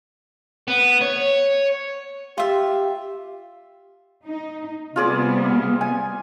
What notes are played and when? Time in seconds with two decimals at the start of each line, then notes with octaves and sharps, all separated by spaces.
0.68 B3
1.01 C#5
2.38 F4 G4 E5
4.24 D#4
4.96 C3 G3 B3 F4 G#4 D5
5.81 G#5